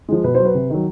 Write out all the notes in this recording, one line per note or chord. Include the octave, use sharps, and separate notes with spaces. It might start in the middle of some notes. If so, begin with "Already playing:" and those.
F3 G#3
B2 B4
F#3 C5
B4
C3
D#3 F#3